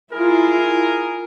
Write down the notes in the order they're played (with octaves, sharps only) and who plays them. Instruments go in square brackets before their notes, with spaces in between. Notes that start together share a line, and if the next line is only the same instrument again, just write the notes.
[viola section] E4 F4 [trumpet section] G#4 A#4